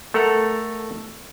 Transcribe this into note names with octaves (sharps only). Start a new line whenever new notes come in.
A3 A4 A#4 F#5 A#5